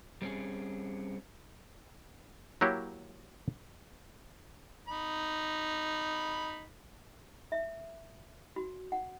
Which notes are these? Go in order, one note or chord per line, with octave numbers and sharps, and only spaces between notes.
G3 C4 C#4 G#4
F#3 A#3 E4 G4 C#5
D#4 B5
E5
F#4
F#5